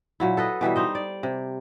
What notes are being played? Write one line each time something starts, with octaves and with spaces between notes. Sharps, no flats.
A#2 F#3 E4
A4 B4 D#5
B2 E3 G3 E5
D#4 C5 D#5
D5
C3